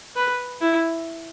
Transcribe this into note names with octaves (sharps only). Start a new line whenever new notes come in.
B4
E4